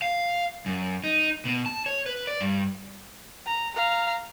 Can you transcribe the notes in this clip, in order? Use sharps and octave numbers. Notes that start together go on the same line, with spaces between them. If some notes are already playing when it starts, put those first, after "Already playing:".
F5
F#2
D#4
B2
A5
C#5
B4
D5
G2
A#5
F5 A#5